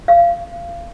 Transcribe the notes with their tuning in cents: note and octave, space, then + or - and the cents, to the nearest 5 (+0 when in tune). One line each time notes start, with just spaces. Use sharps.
F5 -25